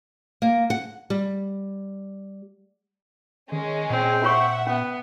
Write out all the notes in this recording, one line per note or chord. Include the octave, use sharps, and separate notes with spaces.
A#3
F#5
G3
D#3 G#3 C#4
A#2 C4
F4 C#5 E5 F#5 C#6
B3 C#4